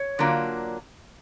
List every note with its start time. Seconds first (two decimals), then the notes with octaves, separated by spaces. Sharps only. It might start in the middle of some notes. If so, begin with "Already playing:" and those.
Already playing: C#5
0.19 D3 F#3 A#3 D4 F4